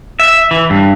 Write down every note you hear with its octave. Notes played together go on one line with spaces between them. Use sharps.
E5
E3
G2